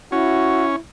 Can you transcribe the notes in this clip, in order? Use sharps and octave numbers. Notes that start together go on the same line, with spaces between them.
C#4 E4 F#4